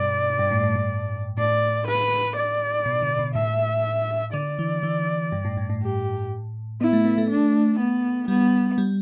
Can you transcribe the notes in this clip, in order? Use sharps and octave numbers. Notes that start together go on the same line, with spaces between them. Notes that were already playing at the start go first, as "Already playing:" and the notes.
Already playing: G2 B2 D5
G2
A2
A2
A2
A2 D5
B4
D5
B2
D3
B2
A2 E5
D3 D5
E3
E3
G2
A2
G2
A2
G4
B3 E4
A3
B3
A3
D4
B3
G3 B3
G3